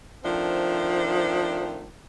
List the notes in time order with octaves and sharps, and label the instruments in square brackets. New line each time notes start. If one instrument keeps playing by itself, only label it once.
[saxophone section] D#3 F3 A3 C4 D4